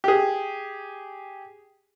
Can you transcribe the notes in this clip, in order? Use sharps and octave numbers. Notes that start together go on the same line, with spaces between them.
G4 G#4